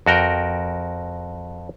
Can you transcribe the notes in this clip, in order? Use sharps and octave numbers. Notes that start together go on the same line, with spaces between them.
F2 F#4 A#4 G5